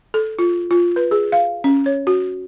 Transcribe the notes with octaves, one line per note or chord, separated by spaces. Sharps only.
A4
F4
F4
B4
G#4
F5
C#4
C#5
F#4